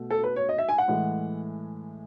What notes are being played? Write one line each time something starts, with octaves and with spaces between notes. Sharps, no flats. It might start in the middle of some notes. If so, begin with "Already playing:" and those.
Already playing: B2 A3
A4
B4
C#5
D#5
E5
G#5
F#5
A2 E3 G#3